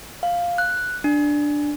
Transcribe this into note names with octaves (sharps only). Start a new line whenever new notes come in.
F5
F#6
D4